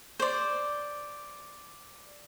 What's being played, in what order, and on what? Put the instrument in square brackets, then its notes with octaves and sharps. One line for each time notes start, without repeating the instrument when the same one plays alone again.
[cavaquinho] C5 D5